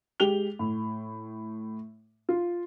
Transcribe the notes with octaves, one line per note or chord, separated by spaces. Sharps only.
G#3 G4 F7 G7
A2
F4